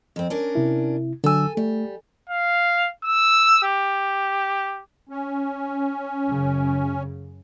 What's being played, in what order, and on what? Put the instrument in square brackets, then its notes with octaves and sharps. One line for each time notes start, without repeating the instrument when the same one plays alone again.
[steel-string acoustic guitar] F2 C4
C#4 D4 A#4
[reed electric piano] C3 E4
[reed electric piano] D3 F#3 E6 [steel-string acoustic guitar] A4 G#5
[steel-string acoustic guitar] G3 [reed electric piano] A3
[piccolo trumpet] F5
E6
G4
[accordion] C#4
[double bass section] F#2 C#3